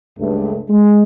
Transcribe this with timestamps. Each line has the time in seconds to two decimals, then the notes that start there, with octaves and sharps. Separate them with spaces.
0.18 C#2 G2 A3
0.68 G#3